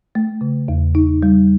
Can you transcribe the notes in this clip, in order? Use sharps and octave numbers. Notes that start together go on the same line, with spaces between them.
A3
C#3
E2
D#4
G3